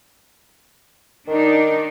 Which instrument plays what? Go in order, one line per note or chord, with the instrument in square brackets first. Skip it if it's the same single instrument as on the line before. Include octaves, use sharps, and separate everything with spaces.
[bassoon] D#3 [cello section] D4 D#4